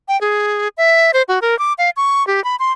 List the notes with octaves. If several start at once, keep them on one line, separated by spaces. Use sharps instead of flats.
G5
G#4
E5
C5
F#4
A#4
D6
F5
C#6
G4
B5
C6